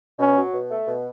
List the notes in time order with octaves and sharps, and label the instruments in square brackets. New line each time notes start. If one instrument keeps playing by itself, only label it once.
[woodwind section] B2 [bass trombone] C#4
[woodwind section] F#3
B2
A3
B2